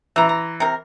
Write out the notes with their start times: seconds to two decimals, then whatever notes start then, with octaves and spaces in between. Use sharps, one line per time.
0.16 E3 E5 A#5
0.29 A#5
0.60 C3 A#4